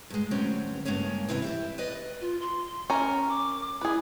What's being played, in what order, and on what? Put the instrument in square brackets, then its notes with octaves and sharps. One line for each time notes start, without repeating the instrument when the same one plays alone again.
[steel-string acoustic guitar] G2 G#3
D2 G2 F#3 C4 C#4
G2 C#3 G#3 A#3 C#4
D2 C3 E3 E4 D#5 E5
E4 G4 E5
B4 D5 D#5
[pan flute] F4
C6
[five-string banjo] C#4 A#4
[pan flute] D6
[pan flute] E4 [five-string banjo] G#4 B4